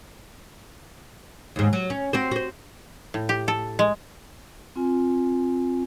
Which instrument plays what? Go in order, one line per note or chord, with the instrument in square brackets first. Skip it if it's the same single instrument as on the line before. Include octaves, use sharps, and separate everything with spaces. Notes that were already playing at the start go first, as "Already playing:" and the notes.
[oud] D#2 G#2
F#3
C#4
C4 F#4 C5
F#4 C5
[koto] A2
G4
A4
G#3
[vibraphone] C4 F4 G#5